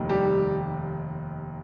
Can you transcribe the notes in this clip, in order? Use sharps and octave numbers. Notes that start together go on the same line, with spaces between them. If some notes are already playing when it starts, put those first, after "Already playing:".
Already playing: F1 D#2 D#3
G3 G4